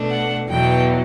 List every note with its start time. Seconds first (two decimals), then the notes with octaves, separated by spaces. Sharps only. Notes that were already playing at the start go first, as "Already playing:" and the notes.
Already playing: B2 A3 D4
0.10 F#5
0.49 E2 B2 F#3 G5